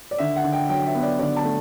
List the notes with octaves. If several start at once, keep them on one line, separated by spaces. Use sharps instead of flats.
D5
D3 E5
F#5
D3
G5
F#3 G5
E5
B3
D5
D3 D5
A5
A3